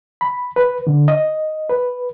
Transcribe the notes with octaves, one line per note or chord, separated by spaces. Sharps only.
B5
B4
D3
D#5
B4